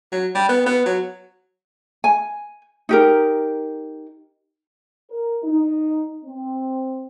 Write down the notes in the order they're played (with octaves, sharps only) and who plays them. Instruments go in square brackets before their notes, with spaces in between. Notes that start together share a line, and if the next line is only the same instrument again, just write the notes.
[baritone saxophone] F#3
G3
B3
B3
F#3
[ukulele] G#5
D#4 G4 A#4
[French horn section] A#4
D#4
C4